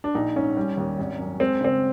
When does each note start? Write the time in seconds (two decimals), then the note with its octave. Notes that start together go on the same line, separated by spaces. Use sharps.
0.04 D4
0.15 A#1 D#4
0.36 G#2 C#4
0.57 G3
0.77 D#2
0.98 G#1
1.19 F#2
1.40 G#3 C4
1.61 C#3 C4